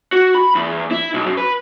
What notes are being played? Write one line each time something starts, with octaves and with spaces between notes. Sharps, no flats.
F#4
B5
E2
E4
B1
F#2
B4